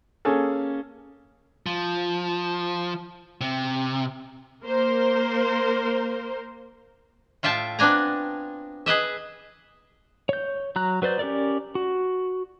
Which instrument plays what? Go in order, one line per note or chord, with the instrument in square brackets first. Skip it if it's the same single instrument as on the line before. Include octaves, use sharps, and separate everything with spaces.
[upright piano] A#3 C#4 G#4 A4
[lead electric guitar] F3
C3
[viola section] A#3 A#4 C5
[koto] A2 F4 E5 G5 A5
B3 C4 D4 G#5 A#5
G#4 B4 D#5 E5
[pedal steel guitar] C#5 G6
F#3 A#5 F#6
F#3 B4 C5 D5 G6
C#4 G4 A4 A#4 D5
F#4